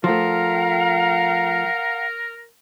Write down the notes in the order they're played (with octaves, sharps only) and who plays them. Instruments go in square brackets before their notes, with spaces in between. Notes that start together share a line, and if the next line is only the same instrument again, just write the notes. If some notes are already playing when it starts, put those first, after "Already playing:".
[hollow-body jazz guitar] F3 A3 [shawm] A#4 [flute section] F5 F#5 A#5